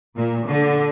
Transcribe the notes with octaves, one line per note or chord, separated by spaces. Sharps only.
A#2
D3